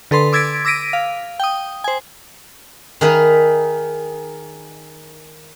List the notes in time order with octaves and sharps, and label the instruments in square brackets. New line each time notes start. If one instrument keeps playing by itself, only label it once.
[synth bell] D3 A4 B4 C6 A6
D6 E6 G#6 A6 B6 D7
D6 E6 A#6 B6 D7 D#7
F5
G5 D#6
C5 G#5
[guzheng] D#3 G#4 A#4 B4 E5